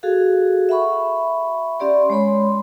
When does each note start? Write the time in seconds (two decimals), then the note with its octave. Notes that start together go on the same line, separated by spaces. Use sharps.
0.03 F#4 G#4 A4 F5
0.69 E5 F#5 B5 C#6
1.80 C#4 G4 D5 C6
2.10 G#3 C#5 B5 C6